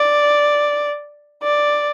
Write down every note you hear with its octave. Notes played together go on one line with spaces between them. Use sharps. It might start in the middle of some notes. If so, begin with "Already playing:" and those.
Already playing: D5
D5